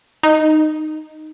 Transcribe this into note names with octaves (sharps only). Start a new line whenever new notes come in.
D#4